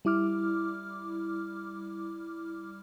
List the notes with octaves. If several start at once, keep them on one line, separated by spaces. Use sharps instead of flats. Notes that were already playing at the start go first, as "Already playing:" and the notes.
G3 E4 D6 F6